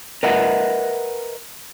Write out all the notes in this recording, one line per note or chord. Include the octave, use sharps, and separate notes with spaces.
A#4 B4 D#5 E5 F#5